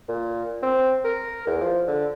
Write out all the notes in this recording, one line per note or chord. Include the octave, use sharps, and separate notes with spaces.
A#2
C4
A#4
E2
F3
D3